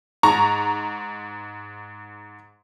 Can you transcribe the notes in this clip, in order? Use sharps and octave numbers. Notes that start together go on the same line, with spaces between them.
G#2 A#5 C#6